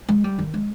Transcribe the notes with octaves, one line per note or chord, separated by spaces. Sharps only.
G#3
G3
D#3
G#3